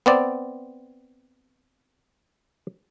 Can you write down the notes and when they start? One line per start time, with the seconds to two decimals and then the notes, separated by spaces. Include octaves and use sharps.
0.06 B3 C4 D5